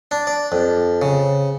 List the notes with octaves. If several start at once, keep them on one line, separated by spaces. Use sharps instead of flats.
D4
D5
F2
C#3